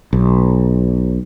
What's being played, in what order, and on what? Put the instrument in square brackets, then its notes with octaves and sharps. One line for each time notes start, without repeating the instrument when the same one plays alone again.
[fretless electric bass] B1